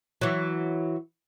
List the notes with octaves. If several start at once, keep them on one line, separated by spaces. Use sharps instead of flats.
E3 F#3